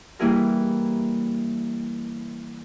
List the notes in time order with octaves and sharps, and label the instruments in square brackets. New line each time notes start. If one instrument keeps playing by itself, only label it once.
[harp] E3 G3 A#3 E4 G#4 A#4